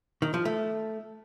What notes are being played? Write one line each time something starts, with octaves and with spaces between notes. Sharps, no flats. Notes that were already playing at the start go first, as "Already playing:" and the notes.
D#3
F3
A3